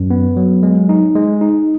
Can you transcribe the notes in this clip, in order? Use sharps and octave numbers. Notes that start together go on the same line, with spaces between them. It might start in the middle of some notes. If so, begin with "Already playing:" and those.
Already playing: F#2
B3
F#3
G#3
D#4
G#3
D#4